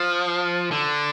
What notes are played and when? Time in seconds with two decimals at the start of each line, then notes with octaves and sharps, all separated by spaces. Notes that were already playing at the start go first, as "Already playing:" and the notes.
Already playing: F3
0.71 D3